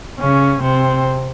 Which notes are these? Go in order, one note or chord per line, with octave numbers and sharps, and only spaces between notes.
C#3 C#4
C3 C4